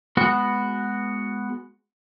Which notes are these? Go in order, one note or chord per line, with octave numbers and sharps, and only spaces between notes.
G#3 B3 F#4